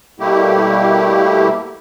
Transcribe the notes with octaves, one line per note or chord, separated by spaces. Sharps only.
B2 G3 A3 A#3 E4 G4